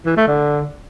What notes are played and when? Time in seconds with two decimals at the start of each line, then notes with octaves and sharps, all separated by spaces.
0.06 E3
0.17 A3
0.27 D3